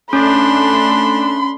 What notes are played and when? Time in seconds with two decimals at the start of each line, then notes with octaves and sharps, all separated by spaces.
0.13 A3 C#4 D4 B5 C6